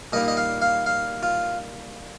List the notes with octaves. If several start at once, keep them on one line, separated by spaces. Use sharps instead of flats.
A#2 G3 A#3 D#4 D#5
D#5
F5
F5
F5
F4